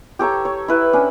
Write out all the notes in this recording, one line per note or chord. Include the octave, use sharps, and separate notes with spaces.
G4 A4 C#5 A#5
C#5
E4 B4
C#4 D4